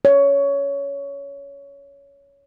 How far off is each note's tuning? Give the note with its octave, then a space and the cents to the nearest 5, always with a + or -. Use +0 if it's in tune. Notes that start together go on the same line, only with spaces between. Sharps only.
C#5 +15